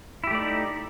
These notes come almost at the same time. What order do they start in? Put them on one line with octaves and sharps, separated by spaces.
E4 G4 A3 D5 D#4